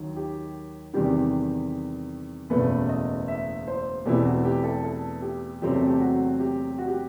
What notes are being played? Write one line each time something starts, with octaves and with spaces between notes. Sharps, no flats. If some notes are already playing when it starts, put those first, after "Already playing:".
Already playing: D#2 D#3 F#3
G4
E2 C3 D#3 G3 G4
F#1 E2 B2 A3 B4
D#5
E5
C5
E2 B2 A3 C4 E4 G4
F#4
G4
A4
A4
G4
E2 C3 F#3 A3 C4 G4
A4
G4
F#4
G4
F#4
G4